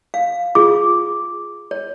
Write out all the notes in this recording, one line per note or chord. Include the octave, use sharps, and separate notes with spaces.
F5
F4 G#4 D6
C#5